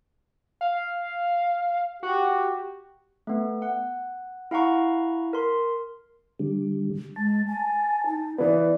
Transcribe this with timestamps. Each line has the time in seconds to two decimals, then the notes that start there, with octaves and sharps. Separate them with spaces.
0.61 F5
2.03 F#4 G4
3.27 A3 B3
3.62 F#5
4.51 E4 F5 F#5 A#5 C#6
5.33 A#4 C6
6.39 D3 G3
7.16 G#3 A5
7.48 G#5
8.07 D#4
8.38 E3 B3 D5